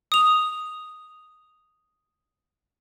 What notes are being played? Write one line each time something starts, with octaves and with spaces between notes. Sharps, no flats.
D#6 F7